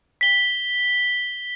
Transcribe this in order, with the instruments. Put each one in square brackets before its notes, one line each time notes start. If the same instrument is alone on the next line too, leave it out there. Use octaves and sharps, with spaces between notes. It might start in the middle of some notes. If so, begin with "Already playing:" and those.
[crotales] B6 G7